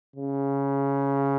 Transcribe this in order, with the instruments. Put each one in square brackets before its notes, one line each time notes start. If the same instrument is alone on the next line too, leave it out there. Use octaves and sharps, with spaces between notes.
[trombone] C#3